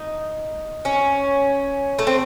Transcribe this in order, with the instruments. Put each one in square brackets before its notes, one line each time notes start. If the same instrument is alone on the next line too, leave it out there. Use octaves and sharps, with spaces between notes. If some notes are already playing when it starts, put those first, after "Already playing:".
Already playing: [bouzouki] D#4
C#4
A3
C4